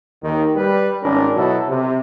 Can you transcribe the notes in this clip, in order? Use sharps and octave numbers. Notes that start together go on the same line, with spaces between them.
D#2 D#3
G3 B4
G#1 C#4 D4 A#4
B2 F#3 E4 A4
C3